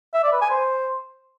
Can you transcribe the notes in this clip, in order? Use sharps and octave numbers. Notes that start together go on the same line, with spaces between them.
E5
D5
B4
G#5
C5